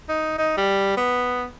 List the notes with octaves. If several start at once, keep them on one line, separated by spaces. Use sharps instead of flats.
D#4
D#4
G3
B3